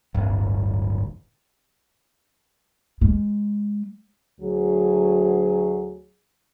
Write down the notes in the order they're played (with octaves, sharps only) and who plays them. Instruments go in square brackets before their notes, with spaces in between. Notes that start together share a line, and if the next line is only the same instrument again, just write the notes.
[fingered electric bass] D1 G1
[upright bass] G#3
[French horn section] D2 F#3 G#4